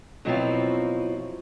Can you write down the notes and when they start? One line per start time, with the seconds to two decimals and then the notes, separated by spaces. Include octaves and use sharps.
0.25 B2 F3 F#3 C4 E4 F4